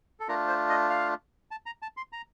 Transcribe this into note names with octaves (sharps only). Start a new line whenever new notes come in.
A4
A3 D4 F4 A#4
C5
D#5
F5
A5
A#5
A5
C6
A#5